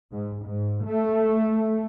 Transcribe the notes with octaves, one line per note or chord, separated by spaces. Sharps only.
G#2
G#2
A3